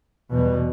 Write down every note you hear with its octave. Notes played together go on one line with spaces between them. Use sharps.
E2 B2 G3